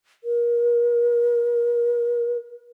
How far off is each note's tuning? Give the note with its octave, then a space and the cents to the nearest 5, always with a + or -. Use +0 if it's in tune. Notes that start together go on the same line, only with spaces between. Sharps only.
A#4 +35